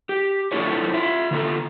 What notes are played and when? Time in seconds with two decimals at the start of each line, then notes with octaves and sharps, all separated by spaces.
0.09 G4
0.52 D4 E4 F4 A4 C5 C#5
0.94 F4 E5
1.31 D3 F4 A4